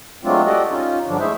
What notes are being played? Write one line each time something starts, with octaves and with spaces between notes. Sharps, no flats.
F#3 G#3 A3 C4 D4 F4
F#4 G4 A4 D5 D#5
C#4 D#4 F4
G2 D3 F3 F#3 D4
G#3 A3 E4 G#4 C5 E5